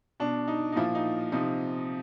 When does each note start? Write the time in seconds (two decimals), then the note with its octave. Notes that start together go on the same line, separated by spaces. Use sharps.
0.20 B2 D4
0.48 D#4
0.72 D#4
0.76 A#2 F3 E4
0.95 D#4
1.32 C3 F3 D#4